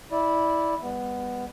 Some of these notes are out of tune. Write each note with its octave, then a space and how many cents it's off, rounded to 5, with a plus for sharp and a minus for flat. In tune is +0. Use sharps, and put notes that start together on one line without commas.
E4 -10 D5 +0
G3 +35 B3 +0